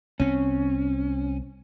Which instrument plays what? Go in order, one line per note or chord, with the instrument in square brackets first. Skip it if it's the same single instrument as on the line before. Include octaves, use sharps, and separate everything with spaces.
[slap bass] C2 C4 [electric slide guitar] C#4